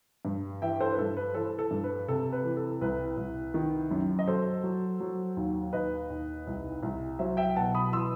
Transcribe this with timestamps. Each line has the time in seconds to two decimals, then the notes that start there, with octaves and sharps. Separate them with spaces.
0.25 G2
0.62 E3 E5 G5
0.80 A4 C5
0.92 B4
0.98 G2 A4
1.17 B4
1.35 E3 A4 C5
1.59 A4
1.71 G2
1.84 B4
2.08 C3 A4
2.32 B4
2.44 E3
2.57 A4
2.81 C2 B4
3.17 C2
3.54 D#3
3.91 F#2
4.19 D#5
4.27 F#3 A4 C5
4.63 F#3
5.00 F#3
5.37 D#2
5.73 D#2 B4 D#5
6.10 D#2
6.47 C2
6.83 C2
7.19 F#3 C5 E5
7.37 E5 G5
7.56 B2 F#5 A5
7.75 B5 D#6
7.92 E3 C6 E6